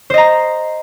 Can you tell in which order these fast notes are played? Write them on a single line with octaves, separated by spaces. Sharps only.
C5 D#5 A#5